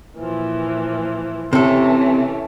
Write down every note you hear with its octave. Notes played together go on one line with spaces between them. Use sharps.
A#2 E3 F3
C3 E3 A3 C#4 A4